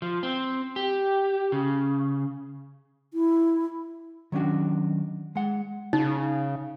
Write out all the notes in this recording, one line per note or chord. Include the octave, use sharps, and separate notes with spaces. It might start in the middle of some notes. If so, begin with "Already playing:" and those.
F3
C4
G4
C#3
E4
D#3 F#3 C#4 D4 F#4
G#3 F#5
C#3 D#4